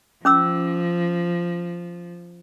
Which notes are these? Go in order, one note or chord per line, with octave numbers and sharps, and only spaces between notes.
F3 C#4 D6 E6